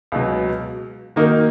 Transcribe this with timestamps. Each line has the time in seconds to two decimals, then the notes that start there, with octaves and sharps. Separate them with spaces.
0.12 C#2 B2 F#3
1.16 D#3 A#3 D#4 F#4 A#4